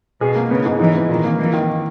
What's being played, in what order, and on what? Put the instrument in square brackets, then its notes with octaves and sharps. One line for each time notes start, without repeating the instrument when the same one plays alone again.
[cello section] B2 [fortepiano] G#4
[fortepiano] A#3
[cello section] C#3 [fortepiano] B3
[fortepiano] G#2
[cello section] E3 [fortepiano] D#4
[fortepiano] E3
[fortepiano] A#2 [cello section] D#3
[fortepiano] A#3
[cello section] E3 [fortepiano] A#3
[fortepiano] D#3